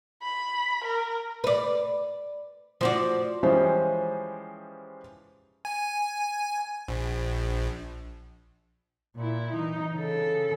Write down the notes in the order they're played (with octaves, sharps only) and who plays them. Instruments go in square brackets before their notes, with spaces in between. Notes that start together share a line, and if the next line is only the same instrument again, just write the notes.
[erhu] B5
A#4
[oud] B4 D5
F3 F#4 D5
[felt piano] E3 F3 G3 G#3 C#4 C5
[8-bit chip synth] G#5
A#1
[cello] A#2 E4
E3 D#4
C#3 A4